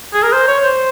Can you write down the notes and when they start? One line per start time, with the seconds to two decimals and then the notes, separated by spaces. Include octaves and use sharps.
0.14 G#4
0.22 A#4
0.32 C5
0.47 C#5
0.63 C5